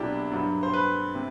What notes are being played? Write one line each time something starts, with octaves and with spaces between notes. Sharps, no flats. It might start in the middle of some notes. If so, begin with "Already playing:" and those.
Already playing: C2 B2 F#3 D4 E4 G4
G2 F#3
C5
B4
C3